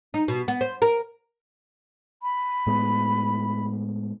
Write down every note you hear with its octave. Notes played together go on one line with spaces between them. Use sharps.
D#4
B2
B3
C5
A#4
B5
A2 G#3 B3